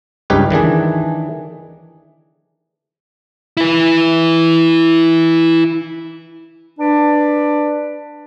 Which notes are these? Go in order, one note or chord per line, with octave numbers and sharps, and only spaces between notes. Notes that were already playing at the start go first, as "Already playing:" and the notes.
C#2 G2 D#4 G4 B4 C#5
D#3 E3 D4 G#4
E4 B4
D4 B4 D5